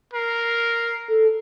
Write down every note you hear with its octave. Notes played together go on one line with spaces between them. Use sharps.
A#4 C7
A4